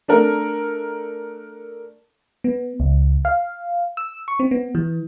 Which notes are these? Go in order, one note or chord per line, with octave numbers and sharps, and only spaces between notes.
A3 D4 A4 A#4
B3
C#2
F5
E6
C#6
C4
B3
E3